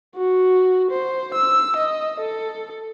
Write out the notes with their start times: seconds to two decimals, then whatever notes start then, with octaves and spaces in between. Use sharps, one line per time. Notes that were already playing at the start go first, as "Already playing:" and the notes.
0.16 F#4
0.91 C5
1.34 E6
1.76 D#5
2.20 A4